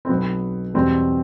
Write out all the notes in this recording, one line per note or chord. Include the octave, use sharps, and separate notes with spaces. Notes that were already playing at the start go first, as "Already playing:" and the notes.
C4
B1 B2 F#3 B3
E2 B2 G3 C4